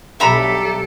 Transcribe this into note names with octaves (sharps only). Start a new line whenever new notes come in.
B1 G2 G4 A4 E5 A#5 B5